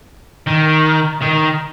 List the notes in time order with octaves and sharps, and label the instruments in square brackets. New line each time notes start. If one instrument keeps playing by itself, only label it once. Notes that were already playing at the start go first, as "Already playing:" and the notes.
[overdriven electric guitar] D#3
D#3